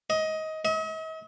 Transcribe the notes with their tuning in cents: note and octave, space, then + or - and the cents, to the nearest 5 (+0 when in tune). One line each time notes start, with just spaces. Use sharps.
D#5 +20
D#5 +45